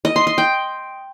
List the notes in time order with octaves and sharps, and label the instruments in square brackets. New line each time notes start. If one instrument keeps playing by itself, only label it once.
[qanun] D#5
C6
C6
G5